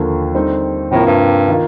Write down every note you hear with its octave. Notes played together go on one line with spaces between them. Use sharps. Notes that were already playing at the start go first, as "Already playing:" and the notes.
Already playing: D#2 D3 F3 A#3
D3 G3 C4 D#4
A2 C3 F3 A#3
G2
D#3 A#3 F4